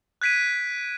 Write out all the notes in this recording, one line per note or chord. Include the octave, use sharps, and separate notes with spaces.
F#6 G#6 B6 D7 D#7